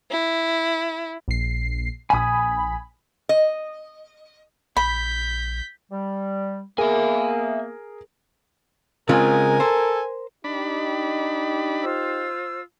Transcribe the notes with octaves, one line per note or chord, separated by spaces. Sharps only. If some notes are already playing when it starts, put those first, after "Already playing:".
E4
A#1 C7
A#1 G#5 B5 D#6
D#5
A#1 B5 G6 B6
G3
A#3 B3 G#4 A#4 E5 G#5
C#3 G#3 C4 F4 A#4 G#5
A4 C5
D4 D#4 G4 D#5 B5
F4 C5 E6